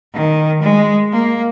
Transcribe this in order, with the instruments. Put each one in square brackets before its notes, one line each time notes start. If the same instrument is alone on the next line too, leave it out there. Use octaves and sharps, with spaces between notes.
[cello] D#3
G#3
A#3